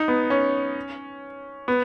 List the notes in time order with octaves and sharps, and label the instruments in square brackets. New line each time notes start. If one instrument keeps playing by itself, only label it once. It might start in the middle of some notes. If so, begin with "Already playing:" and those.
Already playing: [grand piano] D#4
B3
C#4
B3